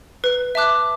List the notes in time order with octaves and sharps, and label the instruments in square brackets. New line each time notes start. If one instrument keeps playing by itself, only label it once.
[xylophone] B4
E5 A5 D6 F#6